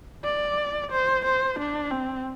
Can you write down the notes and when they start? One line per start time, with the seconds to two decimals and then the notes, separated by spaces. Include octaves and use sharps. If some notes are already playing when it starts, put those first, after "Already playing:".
0.24 D5
0.91 C5
1.25 C5
1.59 D4
1.91 C4